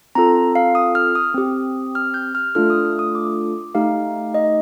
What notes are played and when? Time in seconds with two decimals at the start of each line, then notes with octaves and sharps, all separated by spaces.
0.15 C4 F4 A4 A#5
0.55 F5
0.75 D#6
0.95 F6
1.15 D#6
1.34 C4 G4
1.95 F6
2.14 G6
2.35 F6
2.55 A3 D4 F4 A4 F6
2.70 D#6
2.85 D#6
2.99 D#6
3.15 D6
3.75 A3 D#4 G4 F5
4.34 D#5